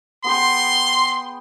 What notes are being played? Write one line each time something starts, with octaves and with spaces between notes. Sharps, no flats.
B3 G#4 G5 C6